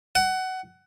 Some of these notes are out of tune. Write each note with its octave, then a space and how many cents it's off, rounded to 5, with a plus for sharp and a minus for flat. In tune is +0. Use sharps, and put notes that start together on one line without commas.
F#5 +20